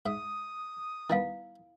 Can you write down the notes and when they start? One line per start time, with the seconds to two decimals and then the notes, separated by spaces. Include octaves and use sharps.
0.06 G#2 E5 D#6
1.10 D#3 G3 B3 E4 F5